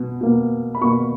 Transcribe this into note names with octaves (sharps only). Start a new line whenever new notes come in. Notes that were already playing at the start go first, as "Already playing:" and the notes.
Already playing: B2
B2 A#3
B5
B2 A#3 C#6